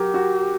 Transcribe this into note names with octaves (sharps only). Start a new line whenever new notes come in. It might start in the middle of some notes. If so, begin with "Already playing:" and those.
Already playing: F#3 F#4 G4 A#4
F#4